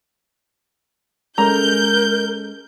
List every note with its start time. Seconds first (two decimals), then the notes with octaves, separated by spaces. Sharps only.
1.38 G#3 C#4 A4 A#4 A#5 G6